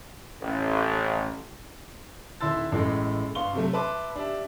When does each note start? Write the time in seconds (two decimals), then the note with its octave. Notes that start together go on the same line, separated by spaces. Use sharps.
0.42 A1
2.41 D#1 E4 C6 E6 A6
2.72 A1 A2 G#3
3.35 G2 B3 F5 C6 C#6 G7
3.53 C3 F#3 A3
3.73 B4 E5 A5 C6 D6
4.16 D4 G4 E5